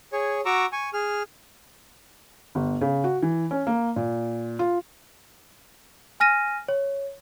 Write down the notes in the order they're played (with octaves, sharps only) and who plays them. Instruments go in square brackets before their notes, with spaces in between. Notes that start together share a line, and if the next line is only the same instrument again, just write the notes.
[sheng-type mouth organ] G#4 C#5
F#4 A#5 C#6 D6 E6
G#5 C#6
G#4 F6
[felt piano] G1
C#3
F#4
E3
C#4
A#3
A#2
F4
[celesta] G#5 F6 A#6 D#7
C#5